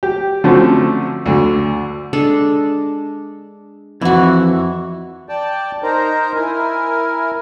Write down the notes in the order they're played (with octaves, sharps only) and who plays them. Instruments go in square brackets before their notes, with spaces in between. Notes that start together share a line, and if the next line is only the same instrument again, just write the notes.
[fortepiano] G4
D3 F3 F#3 A3 C4 C#4
D2 D3
[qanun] G#3 D4 A4
[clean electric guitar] F2 E3 [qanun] E4 F#4
[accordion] D5 G5 A5
D#4 A#4 C5 A#5
E4 A#4 G#5